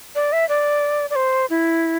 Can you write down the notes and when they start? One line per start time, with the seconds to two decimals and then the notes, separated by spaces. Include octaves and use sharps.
0.15 D5
0.32 E5
0.49 D5
1.10 D5
1.15 C5
1.50 E4